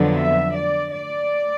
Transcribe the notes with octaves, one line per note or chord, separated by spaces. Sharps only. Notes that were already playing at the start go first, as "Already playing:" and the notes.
Already playing: F2 D3 F#3 B3
E5
D5
D5